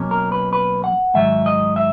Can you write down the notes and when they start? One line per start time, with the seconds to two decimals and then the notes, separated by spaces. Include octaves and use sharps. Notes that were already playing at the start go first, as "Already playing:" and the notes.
Already playing: B2 F#3 A#3 C#4
0.11 A#4
0.32 B4
0.53 B4
0.84 F#5
1.14 G#2 D#3 F#3 E5
1.46 D#5
1.76 E5